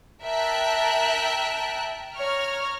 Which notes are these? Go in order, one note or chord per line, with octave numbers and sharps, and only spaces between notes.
A#4 E5 G5 A5 F#6
C#5 A#5 F6